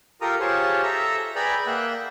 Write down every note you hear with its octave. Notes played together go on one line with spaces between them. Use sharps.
F4 G4 A4 A#4 A#5 D#6
F4 G4 G#4 C5 C#5 A5
A4 E5 A#5
G#4 B4 D5 G5 A#5 B5
A#3 E5 F#5 G5